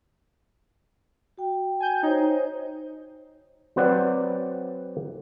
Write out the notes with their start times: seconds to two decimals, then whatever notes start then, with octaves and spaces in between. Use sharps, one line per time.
1.38 F#4 G5
1.80 G#5 G6
2.03 D#4 C5 C#5
3.76 F#3 C4 B4 C5 D5 F#5